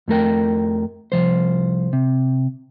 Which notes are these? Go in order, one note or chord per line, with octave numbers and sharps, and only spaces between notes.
F2 A3 A#4 G5
C2 F#2 F3 C5
C3